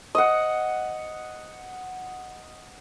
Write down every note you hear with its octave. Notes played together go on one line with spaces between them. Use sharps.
D#5 F#5